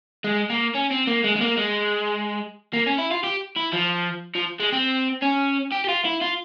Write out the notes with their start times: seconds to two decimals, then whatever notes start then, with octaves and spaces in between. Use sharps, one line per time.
0.24 G#3
0.50 A#3
0.75 C#4
0.91 C4
1.07 A#3
1.24 G#3
1.36 G#3
1.41 A#3
1.57 G#3
2.73 A#3
2.86 C#4
2.98 E4
3.11 F4
3.24 G4
3.57 E4
3.73 F3
4.35 F3
4.60 G#3
4.72 C4
5.22 C#4
5.72 G4
5.84 G4
5.89 F4
6.05 E4
6.22 F4